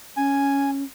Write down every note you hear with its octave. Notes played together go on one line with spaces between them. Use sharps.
C#4 G#5